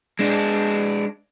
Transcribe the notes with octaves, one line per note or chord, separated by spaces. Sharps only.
G#3 D4